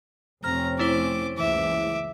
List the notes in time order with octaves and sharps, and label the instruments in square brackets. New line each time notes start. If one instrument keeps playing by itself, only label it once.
[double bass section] F1 C4 C#4 [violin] A#5 [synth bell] F6
[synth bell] A3 E4 C5 [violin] D6
[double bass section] F#1 C#2 E3 [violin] E5 D6